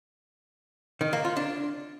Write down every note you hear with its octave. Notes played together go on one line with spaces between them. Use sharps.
D#3
A#3
F4
D4